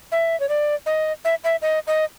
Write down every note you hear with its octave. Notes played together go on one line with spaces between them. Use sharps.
E5
C#5
D5
D#5
E5
E5
D#5
D#5